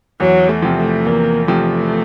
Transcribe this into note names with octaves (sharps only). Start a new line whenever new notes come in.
E2 F#3
A3
C3 F3
A3
E2 A#3
C3 F3 A3